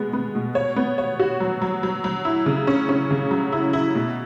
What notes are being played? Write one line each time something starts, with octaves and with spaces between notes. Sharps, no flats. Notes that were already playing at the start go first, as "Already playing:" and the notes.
Already playing: B2 G#3 B3
B3
B2
C#5
B3
C#5
F#4
F#3
F#3
F#3
F#3
E4
C#3
C#4
C#4
C#3
F#3
E4
E4
B2